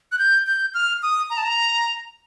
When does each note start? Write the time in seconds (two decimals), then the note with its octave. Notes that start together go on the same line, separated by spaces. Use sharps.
0.12 F#6
0.19 G6
0.47 G6
0.74 F6
1.03 D#6
1.30 A#5
1.38 A5
1.45 A#5